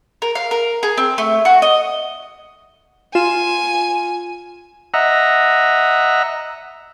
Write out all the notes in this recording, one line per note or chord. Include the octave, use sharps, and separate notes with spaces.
A#4
F5
A#4
G#4
C4
A3
F#4
D#5
F4 G#5 E7
D#5 E5 F#5 A#5